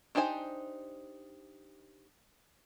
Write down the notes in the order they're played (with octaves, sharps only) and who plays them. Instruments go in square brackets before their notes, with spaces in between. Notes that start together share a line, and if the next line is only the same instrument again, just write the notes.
[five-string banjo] D4 D#4 G4 C5 G#5